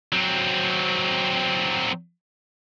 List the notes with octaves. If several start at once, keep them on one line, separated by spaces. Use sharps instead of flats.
F#3 C4